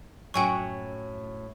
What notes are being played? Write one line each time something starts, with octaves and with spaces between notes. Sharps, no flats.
F#2 A2 F#4 G5 G#5 C#6